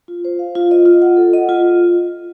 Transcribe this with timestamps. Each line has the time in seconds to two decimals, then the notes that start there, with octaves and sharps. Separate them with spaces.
0.08 F4
0.25 C5
0.39 F5
0.55 F4
0.71 D#5
0.86 F4
1.02 F#5
1.17 A4
1.33 D#5
1.49 F4